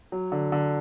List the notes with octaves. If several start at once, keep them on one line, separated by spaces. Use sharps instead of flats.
F#3
D3
D3